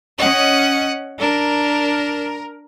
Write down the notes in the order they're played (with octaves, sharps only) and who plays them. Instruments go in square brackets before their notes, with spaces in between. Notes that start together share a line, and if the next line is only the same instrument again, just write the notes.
[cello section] C#4 D#5 [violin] F#5
[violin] D4 [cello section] A#4